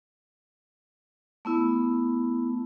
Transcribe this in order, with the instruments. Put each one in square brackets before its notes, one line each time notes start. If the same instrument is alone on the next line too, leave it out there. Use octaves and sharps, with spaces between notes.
[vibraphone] A3 B3 E4